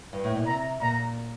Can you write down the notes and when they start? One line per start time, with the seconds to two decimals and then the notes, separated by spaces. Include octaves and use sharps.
0.13 G2
0.24 A2
0.35 A#2
0.47 C3 A#5
0.81 A#2 A#5